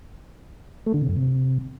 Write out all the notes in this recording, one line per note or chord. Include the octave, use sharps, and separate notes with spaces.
A3
D3
C3
F#2
C3